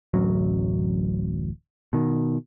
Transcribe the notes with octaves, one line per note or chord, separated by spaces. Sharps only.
D1 A1 F#2 F#3
B2 D#3